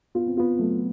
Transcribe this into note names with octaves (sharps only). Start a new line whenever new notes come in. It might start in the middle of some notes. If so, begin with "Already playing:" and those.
B3 F4
C4
B3 F4
F#3 A3